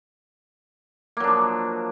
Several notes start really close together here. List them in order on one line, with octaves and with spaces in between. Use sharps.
A#3 F#3 D4 F3